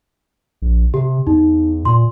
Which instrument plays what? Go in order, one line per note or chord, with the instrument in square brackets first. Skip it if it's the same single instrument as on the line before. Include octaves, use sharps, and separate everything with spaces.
[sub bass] A#1
[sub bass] C3 [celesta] G4
[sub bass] E2 [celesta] D#4
[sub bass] A#2 [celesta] C6